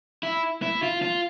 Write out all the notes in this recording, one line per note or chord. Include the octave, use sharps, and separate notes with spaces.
E4
E4
F4
F4